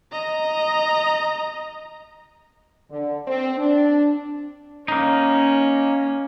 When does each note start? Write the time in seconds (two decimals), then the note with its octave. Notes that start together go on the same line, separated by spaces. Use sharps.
0.12 D#5 A#5
2.91 D3
3.27 C4
3.58 D4
4.88 A#3 C#4 D#4